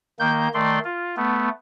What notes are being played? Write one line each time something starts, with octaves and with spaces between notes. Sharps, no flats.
D#3 A#3 G6
D#3 A3 D5 C6
F4
A3 B3